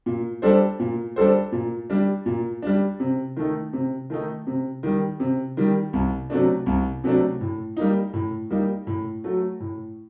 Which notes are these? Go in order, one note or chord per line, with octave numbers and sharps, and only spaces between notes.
A#2
G3 D4 A4 C5
A#2
G3 D4 A4 C5
A#2
G3 D4
A#2
G3 D4
C3
D#3 A3 D#4
C3
D#3 A3 D#4
C3
D#3 G3
C3
D#3 G3
C2
C3 F#3 A3 D4
C2
C3 F#3 A3 D4
A2
G3 A#3 D#4
A2
G3 A#3 D#4
A2
F#3 A3
A2